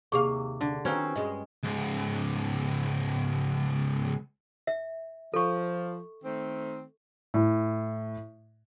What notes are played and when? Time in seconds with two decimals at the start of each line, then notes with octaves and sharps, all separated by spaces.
0.12 D#2 C3 G4 G#4 F5 D6
0.61 D3
0.85 D#3 C4 C#4 F4 F#4 B4 C5
1.16 G2 G#3 D#5
1.63 C#2 G#2
4.67 E5
5.34 F3 A4 C#6
6.24 D#3 A3 C4
7.34 A2